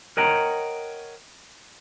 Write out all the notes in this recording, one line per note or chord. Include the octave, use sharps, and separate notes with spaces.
A#4 C#5 D#5 F#5 G5 A#5